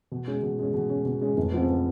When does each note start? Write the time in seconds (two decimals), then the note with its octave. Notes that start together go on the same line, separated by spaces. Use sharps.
0.12 B2
0.27 G#3 C#4
0.43 B2
0.59 G#3 C#4
0.74 B2
0.90 G#3 C#4
1.05 B2
1.21 G#3 C#4
1.37 F1
1.52 F2 C#3 F3 B3